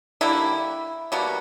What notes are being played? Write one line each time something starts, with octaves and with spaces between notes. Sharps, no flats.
D3 G3 A#3 E4
B2 G3 A#3 F#4